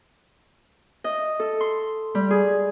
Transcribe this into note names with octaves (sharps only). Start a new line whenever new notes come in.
D#5
A4
C6
G3
G#4